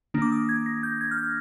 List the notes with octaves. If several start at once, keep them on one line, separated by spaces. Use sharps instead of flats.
D#3 A#3 D4
D6
D#6
G#6
A#6
G6
G#6
F6
G6